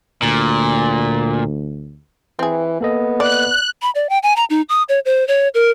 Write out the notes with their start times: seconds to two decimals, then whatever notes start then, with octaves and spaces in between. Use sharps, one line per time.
0.22 D2 A#2
2.39 E3 C4 G#4
2.81 A#3 B3 A4 D#5
3.20 D5 F#6
3.82 B5
3.95 D5
4.09 G5
4.23 G#5
4.36 A#5
4.50 D#4
4.69 D#6
4.89 C#5
5.05 C5
5.28 C#5
5.54 A#4